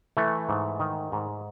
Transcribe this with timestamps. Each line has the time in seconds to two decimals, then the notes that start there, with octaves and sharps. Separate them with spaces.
0.17 E3 A3
0.49 G#2
0.80 D#3
1.12 G#2